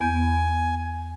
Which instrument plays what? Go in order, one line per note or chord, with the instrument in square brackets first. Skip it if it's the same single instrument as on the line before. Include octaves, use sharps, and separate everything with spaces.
[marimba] E2 B3 G6 [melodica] G#5